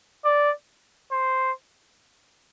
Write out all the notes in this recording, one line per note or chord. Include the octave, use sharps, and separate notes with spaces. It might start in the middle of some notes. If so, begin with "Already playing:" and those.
D5
C5